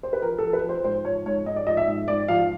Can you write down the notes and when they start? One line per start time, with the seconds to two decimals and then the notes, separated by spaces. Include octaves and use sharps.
0.03 C5
0.13 B4
0.22 F3 A#4
0.38 A4
0.43 F3
0.53 B4
0.64 F3
0.69 C5
0.84 G#2 C5
1.05 F3 C#5
1.26 G#2 C#5
1.46 G#2 D#5
1.56 D5
1.67 F3 D#5
1.77 E5
1.88 G#2
2.08 G#2 D5
2.28 F3 F5